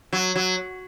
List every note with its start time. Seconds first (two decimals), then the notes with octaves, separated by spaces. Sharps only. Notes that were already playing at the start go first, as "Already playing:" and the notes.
0.13 F#3
0.36 F#3